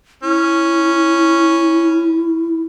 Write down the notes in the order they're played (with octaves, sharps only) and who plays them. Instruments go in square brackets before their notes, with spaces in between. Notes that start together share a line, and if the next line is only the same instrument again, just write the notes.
[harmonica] C#4 [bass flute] E4